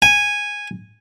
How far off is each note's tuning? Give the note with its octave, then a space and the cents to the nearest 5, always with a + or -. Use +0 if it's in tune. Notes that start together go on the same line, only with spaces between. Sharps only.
G#5 -10